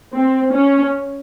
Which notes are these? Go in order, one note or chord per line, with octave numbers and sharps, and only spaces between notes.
C4
C#4